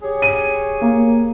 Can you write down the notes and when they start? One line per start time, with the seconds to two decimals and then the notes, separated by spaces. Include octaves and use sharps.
0.03 G4 G#4 C#5
0.22 D#7
0.81 A#3